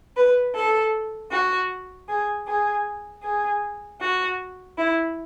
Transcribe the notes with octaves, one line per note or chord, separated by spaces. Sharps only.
B4
A4
F#4
G#4
G#4
G#4
F#4
E4